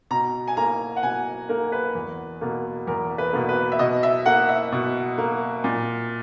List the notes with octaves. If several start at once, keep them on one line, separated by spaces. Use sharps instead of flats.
B2 A#5
G#5
A#3 A#5
F#5
B2 G#5
A#3 A#4
B4
E2
B2 A#3
E2 A#4
B4
B2 A#3
B4
E5
B2 D#5
E5
A#3 F#5
E5
B2
A#3
A#2